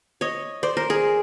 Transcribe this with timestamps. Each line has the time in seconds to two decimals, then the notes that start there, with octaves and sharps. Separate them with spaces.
0.21 C#5 D#5
0.63 C5 D5
0.77 A#4 C5
0.90 G#4 A#4